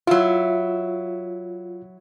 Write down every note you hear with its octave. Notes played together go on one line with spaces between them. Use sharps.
F#3 E4 F4